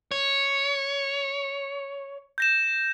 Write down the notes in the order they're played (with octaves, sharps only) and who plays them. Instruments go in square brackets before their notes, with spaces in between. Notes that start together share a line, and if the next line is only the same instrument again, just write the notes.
[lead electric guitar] C#5
[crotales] G6 A#6 E7